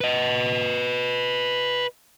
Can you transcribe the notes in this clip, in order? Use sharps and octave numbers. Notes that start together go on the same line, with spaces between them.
B4 D#5